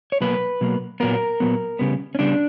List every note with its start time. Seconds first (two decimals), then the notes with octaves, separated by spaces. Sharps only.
0.12 C#5
0.21 B2 F#3 A#3 B4
0.61 B2 F#3 A#3
1.00 A#2 F#3 B3 A#4
1.40 A#2 F#3 B3
1.79 C#3 G3 B3
2.15 C#4
2.19 C#3 G3 B3 D4